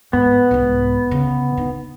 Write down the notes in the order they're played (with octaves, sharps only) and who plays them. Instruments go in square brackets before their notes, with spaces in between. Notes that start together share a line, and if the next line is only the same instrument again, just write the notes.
[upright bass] G#2 [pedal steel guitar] B3
[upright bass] C2 G#2
C#3
D#4